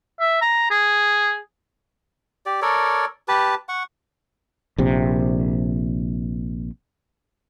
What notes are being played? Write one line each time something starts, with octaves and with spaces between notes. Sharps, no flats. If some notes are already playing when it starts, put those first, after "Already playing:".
E5
A#5
G#4
G4 D5
A4 A#4 C#5 D5
G4 B4 A5
F#5 C#6
A#1 C3